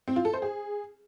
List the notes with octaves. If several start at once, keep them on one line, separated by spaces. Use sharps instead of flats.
C4
F4
A4
C5
G#4